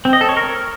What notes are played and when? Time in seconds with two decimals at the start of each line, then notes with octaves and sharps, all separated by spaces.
0.05 C4
0.13 D#5
0.21 A4
0.29 C#5
0.37 A#4